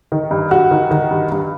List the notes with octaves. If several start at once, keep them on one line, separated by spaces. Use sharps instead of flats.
D#3
G2
G2 F#4
D#3
D#3
G2
G2